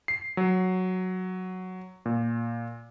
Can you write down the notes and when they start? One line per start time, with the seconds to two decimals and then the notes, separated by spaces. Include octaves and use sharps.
0.08 C7
0.37 F#3
2.06 A#2